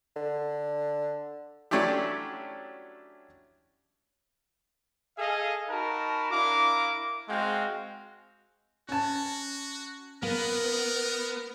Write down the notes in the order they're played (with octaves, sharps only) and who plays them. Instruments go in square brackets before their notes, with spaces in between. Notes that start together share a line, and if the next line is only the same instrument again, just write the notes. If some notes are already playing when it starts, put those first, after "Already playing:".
[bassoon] D3
[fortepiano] F#3 A3 C#4 D4 E4 G4
[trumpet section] G#4 A4 D#5 F5
D#4 F#4 A#4 A5 B5
D4 E4 A#4 F5 D6
G#3 C4 F#4 F5 G5
[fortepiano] C#4 A5 [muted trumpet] F#4
[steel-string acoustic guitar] A#3 [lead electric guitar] B3 [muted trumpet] A#4